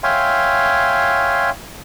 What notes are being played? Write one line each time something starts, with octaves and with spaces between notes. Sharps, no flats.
C#5 E5 F5 G5 G#5 C6